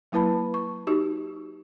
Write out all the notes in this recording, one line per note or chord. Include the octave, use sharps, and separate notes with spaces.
F#3 A#3 E4 B4 A5 B5
C#6
D#4 F#4 G4